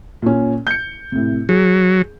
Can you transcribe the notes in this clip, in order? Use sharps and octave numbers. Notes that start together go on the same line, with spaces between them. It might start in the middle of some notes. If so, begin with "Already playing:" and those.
A#2 C#4
G6 C#7
A2 C3
F#3 G#4